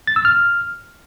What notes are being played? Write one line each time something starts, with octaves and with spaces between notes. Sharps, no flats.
A6
E6
F6